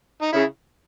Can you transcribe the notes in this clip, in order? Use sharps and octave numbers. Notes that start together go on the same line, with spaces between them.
D#4
C#3 E4